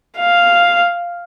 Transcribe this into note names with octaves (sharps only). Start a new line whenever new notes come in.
F5